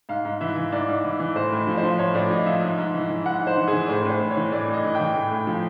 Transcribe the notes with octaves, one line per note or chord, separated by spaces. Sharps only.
G#2 F5
G#2
E3 E5
E3
G#2 D5
G#2
E3
E3
A2 C5
A2
F3
C5
F3
A2 C#5
A2 D5
F3 D#5
F3 E5
G#2
G#2
E3
E3
G#2 F#5
G#2
C5
E3
G#4
E3
A2 C5
A2 C5
E3
C#5
E3
A2 D5
A2
D#5
E3
G5
E3
A2
A2
F3